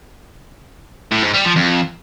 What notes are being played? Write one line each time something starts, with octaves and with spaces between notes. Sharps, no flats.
A2
G#2
G3
F3
F2